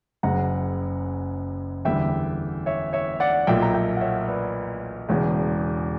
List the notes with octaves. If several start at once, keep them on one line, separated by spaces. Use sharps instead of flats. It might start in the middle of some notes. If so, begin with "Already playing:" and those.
F#1 F#2 C#3 F#5 A#5
E2 D3 G3 E5 G5
C#5 E5
C#5 E5
D5 F#5
B1 A#2 A#3 E5 G5
A#5
E5 G5
F#5
C#5 E5
B4 D5
E1 E2 C#3